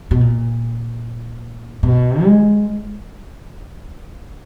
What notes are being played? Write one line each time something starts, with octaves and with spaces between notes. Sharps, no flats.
B2
A#2
B2
G#3